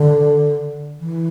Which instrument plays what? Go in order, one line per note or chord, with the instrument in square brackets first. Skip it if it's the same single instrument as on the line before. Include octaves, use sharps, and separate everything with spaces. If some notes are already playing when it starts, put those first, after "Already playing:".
Already playing: [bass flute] D3
E3